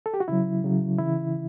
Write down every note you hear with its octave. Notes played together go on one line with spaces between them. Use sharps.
A4
G4
F#4
C#3 F#3 E4
C#3 F#3
C#3 E3 E4